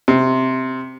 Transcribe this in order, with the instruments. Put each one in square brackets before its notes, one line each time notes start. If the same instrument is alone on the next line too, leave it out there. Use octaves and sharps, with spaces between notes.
[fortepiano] C3